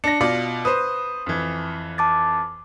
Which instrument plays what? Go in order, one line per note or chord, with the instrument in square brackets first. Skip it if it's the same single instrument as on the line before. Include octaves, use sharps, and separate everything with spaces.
[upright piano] D4 A#6 [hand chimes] C#7
[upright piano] B2 F4 D5
[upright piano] B4 C5 [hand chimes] D#6
[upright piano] F2 E3
[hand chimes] A5 D6 A6